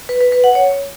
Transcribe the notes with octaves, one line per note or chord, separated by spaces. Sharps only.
B4
B4
B4
F#5
C#5